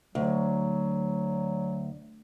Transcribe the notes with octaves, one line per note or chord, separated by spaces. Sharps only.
D2 F#3